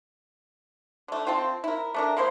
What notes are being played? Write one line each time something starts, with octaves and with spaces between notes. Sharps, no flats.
D3 A3
C4 F4 G5 A5
E4 A#4
A3 D4 A#4
G#3 A#3 E4 C5